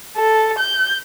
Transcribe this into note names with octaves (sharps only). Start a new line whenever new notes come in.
A4
G6